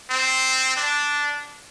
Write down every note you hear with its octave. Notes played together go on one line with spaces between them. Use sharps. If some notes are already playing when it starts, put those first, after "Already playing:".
C4
D4